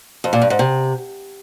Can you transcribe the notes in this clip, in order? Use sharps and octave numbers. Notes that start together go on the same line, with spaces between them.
F2
A#2
G2
G#2
C3